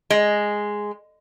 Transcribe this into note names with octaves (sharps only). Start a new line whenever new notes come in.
G#3